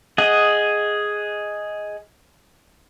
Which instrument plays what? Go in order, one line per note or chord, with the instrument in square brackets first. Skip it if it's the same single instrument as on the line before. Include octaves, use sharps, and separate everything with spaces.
[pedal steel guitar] G#4 D#5 F#5